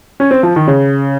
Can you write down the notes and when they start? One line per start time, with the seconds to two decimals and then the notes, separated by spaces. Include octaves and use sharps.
0.20 C#4
0.31 C4
0.43 F3
0.56 D#3
0.68 C#3